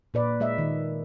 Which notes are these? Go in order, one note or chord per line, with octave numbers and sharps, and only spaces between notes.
A#2 B4 D5
G#3 D#5 E5
D#3